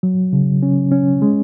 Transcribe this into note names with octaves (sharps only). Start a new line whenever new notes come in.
F#3
C#3
C#4
C#4
G#3